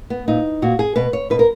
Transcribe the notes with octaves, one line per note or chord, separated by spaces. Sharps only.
B3
A#2 D#4
A#2 F#4
G#4
B2 B4
C#5
B2 B4
A#4